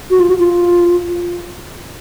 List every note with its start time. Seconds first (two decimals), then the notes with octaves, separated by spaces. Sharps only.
0.11 F#4
0.20 F4
0.30 F#4
0.39 F4